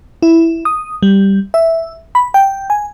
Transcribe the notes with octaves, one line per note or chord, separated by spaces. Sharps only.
E4
D#6
G3
E5
B5
G5
G#5